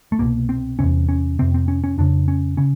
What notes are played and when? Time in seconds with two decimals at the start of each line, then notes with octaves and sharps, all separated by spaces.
0.12 A3
0.19 C2 B2 A#3
0.49 C4
0.79 E2 C3 C#4
1.09 C#4
1.39 F2 C3 C4
1.54 C4
1.68 C#4
1.84 C#4
1.98 F2 C#3 D4
2.28 C#4
2.57 C#3 C#4